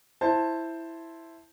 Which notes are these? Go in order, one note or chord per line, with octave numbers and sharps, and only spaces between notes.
E4 C5 A5